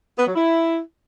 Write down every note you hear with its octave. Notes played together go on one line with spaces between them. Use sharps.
B3
F#3
E4